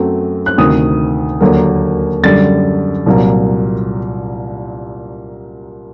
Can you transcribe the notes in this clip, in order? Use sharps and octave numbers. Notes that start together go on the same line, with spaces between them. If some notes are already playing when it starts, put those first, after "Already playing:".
Already playing: F#2 F#3 A3 C4
F#6
D2 C3 D#3 D#6
D#2 D3 F#3 A#3
F#2 D3 G3 A6
C2 A#2 F#3 A#3